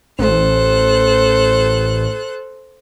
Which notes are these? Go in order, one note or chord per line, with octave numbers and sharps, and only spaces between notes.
A1 A4 C5 F#6